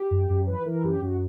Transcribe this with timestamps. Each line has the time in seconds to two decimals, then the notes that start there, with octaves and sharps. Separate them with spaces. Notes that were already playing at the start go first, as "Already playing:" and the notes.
Already playing: G4
0.11 F#2
0.29 F#2
0.47 E3 B4
0.66 E3 A#4
0.83 F#2 G4
1.02 F#2 F#4